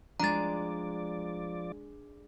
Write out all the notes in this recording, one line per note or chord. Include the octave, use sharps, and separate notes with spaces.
F3 G#3 D4 D5 A#5 A6